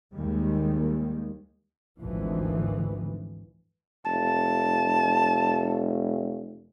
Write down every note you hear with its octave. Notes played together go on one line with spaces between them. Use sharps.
D#2 D#3 G3 G#3
G#1 D2 E3 F3
F1 A5